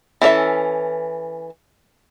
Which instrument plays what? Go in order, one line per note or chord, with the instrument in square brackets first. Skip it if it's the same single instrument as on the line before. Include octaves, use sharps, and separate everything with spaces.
[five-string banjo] E3 C#4 A4 E5